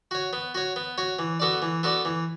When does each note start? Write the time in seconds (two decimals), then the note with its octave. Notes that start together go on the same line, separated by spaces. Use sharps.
0.11 F#4 C#5
0.33 B3
0.55 F#4 C#5
0.76 B3
0.98 F#4 C#5
1.19 E3
1.40 B3 F#4 A4 D5
1.62 E3
1.83 B3 F#4 A4 D5
2.05 E3